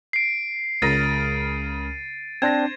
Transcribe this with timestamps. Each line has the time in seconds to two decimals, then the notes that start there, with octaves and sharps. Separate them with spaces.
0.13 C7 D7
0.82 C#2 C#3 A#4 A6 A#6 D#7
2.42 C4 D4 C5 G#6 A#6